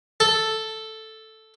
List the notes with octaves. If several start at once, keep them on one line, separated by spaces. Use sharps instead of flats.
A4